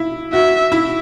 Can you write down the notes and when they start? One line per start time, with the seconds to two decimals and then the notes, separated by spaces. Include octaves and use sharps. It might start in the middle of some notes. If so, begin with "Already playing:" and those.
Already playing: E4
0.33 F#4 E5
0.72 E4